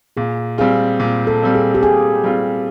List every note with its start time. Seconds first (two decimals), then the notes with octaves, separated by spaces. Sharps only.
0.17 A#2 G#4
0.58 G3 C4 F4 G#4
1.00 A#2
1.27 A4
1.41 G3 C4 F4
1.55 G#4
1.75 G4
1.83 A#2 G#4
2.24 G3 C4 F4